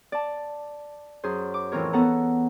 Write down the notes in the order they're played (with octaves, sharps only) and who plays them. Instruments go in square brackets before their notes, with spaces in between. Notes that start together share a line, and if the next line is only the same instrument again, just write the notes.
[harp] D5 A5
F#2 G#4 C5
D6
F2 A2 E3 C4 A#4 C#5
B3 A4 F#5 A#5